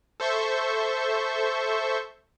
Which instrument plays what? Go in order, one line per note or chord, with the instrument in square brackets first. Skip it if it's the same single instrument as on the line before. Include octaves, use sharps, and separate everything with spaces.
[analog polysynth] A4 C5 E5 C#6 G6